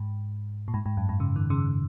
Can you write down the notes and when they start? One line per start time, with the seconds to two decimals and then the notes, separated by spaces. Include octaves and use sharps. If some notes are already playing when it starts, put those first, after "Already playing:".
Already playing: G#2
0.68 A#2
0.74 G#2
0.86 G#2
0.97 F#2
1.09 G#2
1.20 C#3
1.36 D#3
1.50 C#3